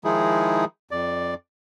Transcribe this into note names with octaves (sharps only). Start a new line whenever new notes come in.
D#3 F3 G#3 D#4 E4 G#4
F2 D5